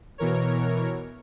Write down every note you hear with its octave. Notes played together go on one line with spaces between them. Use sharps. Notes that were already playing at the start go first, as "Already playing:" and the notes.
B2 E3 A#4 C#5